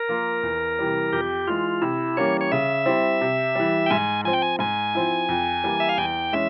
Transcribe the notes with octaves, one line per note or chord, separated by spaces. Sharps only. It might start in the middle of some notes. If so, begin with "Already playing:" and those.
Already playing: A#4
F3 A#3 F4
E2
C3 E3 G3
F2 G4
E3 G#3 F4
C3 E4
E3 G3 A#3 C#4 C#5
C#5
C#3 E5
G3 C4 E4
C3
E3 G3
G5
G#2 G#5
F3 C4 G#5
G5
G#5
G#2 G#5
F3 C4 E4
F2
E3 G3 A#3
E5
F5
E2 G5
E3 G#3 C#4 E5